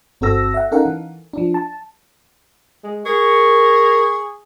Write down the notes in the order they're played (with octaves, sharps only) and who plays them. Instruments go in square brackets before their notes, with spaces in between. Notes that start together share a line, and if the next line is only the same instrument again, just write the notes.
[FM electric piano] G1 C4 F#4 A4 E6 A#6
E5 F#5
C#4 D#4 A4 A#4 F5 F#5
E3
F3 D4
A5
[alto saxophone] G#3
[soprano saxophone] G#4 [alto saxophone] A#4 [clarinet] C#6